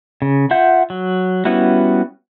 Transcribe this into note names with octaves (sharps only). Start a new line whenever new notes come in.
C#3
F4 E5 F#5 G6
F#3
G3 B3 C#4 E4 F#4